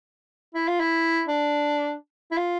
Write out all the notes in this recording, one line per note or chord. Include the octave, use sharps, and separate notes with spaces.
E4
F4
E4
D4
E4
F4